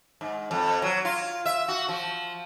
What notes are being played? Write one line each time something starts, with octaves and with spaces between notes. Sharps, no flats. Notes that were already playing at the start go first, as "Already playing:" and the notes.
G#2
F2
F#3
F4
E5
F#4
F3